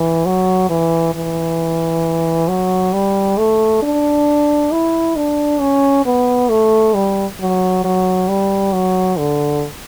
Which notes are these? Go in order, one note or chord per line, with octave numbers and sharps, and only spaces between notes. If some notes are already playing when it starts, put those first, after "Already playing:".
Already playing: E3
F#3
E3
E3
F#3
G3
A3
D4
E4
D4
C#4
B3
A3
G3
F#3
F#3
G3
F#3
D3